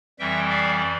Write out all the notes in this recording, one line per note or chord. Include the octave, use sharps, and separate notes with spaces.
F2 E3 G3 E5 G5
D5 F5